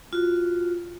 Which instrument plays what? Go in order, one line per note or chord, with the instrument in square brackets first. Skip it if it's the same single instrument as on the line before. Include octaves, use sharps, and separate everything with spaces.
[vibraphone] F4 F#4